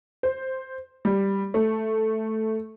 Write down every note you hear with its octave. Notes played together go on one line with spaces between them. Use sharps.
C5
G3
A3